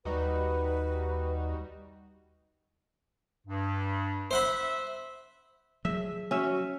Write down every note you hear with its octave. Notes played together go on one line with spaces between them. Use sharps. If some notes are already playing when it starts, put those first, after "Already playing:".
D#2 G3 D#4 F#4 B4
G2
C5 E5 F#5 B5
F3 F#3 G#4 E5
C#4 F#4 E5